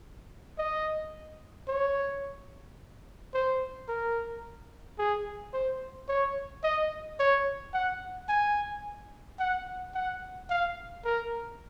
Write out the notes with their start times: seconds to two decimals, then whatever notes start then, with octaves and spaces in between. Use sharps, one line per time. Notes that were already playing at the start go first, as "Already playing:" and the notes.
0.58 D#5
1.68 C#5
3.34 C5
3.88 A#4
4.98 G#4
5.53 C5
6.08 C#5
6.64 D#5
7.19 C#5
7.73 F#5
8.29 G#5
9.39 F#5
9.94 F#5
10.50 F5
11.05 A#4